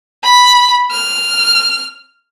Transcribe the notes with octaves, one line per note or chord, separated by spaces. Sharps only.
B5
F6